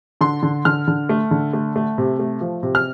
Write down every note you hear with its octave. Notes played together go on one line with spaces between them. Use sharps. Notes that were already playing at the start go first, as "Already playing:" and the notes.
D3 C6
D3
D3 F6
D3
A3
D3
A3
A3
C3
A3
F3
C3
F6